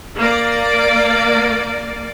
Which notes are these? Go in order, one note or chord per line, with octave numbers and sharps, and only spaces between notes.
A#3 D5